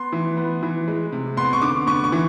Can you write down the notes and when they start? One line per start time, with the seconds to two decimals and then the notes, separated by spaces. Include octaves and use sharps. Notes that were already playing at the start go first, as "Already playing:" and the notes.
Already playing: B3 C6
0.12 E3
0.37 B3
0.63 E3
0.88 G#3
1.12 C3
1.37 B3 C6
1.53 C#6
1.62 D3 D6
1.87 B3 C#6
2.04 C#6
2.12 E3